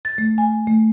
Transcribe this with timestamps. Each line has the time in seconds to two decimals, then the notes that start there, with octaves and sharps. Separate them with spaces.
0.05 A6
0.18 A3
0.38 G#5
0.67 A3